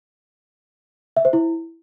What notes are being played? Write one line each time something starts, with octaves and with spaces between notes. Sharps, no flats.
E5
C5
E4